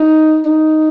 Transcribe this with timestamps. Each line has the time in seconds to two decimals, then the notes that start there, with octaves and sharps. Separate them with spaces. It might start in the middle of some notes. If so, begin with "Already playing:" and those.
Already playing: D#4
0.45 D#4